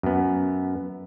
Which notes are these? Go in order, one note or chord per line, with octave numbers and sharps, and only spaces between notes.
F#2 B3